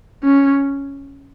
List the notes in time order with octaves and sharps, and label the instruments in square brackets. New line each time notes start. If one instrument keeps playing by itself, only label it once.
[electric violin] C#4